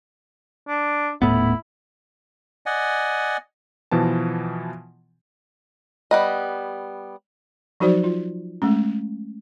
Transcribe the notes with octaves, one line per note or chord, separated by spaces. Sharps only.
D4
D#1 A2 B3 E4
D5 D#5 F#5 G#5
B2 E3 F3 A5
G3 B3 D#5
F3 F#3 D#4 F#4 C5 D5
F4
G#3 A3 C#4